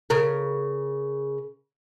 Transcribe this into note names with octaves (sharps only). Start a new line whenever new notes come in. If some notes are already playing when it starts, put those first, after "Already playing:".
C#3 A#4